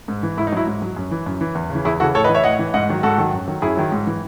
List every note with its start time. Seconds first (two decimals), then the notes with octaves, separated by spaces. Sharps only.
0.08 G#2
0.23 E3
0.37 G#2 E4
0.47 D#4
0.52 F#3 E4
0.67 G#2
0.82 F#3
0.97 F#2
1.11 E3
1.26 F#2
1.41 E3
1.55 E2
1.70 C#3
1.75 E3
1.85 E2 E4 G#4
2.00 C#3 E3 F#4 A4
2.14 A2 A4 C#5
2.24 B4 D#5
2.29 E3
2.35 C#5 E5
2.44 A2 D#5 F#5
2.59 E3
2.74 G#2 D#5 F#5
2.89 D#3 F#3
3.03 G#2 F#4 A4
3.18 D#3 F#3
3.33 F#2
3.47 D#3 F#3
3.62 F#2 E4 G#4
3.77 D#3 F#3
3.92 G#2
4.07 E3